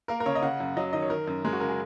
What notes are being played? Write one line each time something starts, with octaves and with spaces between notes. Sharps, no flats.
A#3 A#4
A#4
C#3 C#5
D#5
C#3 F#5
F#2
F#3 D#5
D#3 D#5
C#5
D#3 A#4
F#2
G#3 A#4
F#4
C#3 A#4
G#4